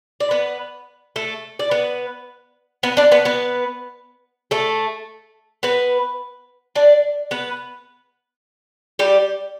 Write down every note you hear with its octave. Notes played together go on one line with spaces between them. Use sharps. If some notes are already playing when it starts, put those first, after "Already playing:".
D5
B3 B4
A3 A4
D5
B3 B4
B3 B4
D4 D5
B3 B4
B3 B4
A3 A4
B3 B4
D4 D5
B3 B4
G3 G4